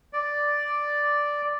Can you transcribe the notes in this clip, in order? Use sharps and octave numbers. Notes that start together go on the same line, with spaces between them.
D5